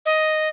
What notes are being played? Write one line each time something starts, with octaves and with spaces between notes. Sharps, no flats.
D#5